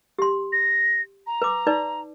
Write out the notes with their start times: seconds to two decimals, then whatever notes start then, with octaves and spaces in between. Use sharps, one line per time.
0.19 G4 C6
0.52 A#6
1.27 A#5
1.42 B4 D6
1.67 D#4 B4 D5